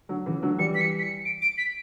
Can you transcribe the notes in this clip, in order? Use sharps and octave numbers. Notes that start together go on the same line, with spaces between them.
D3 F#3
C#3 E3
D3 F#3
E3 G3 C#7
B6
C#7
B6
C#7
D7
D7
B6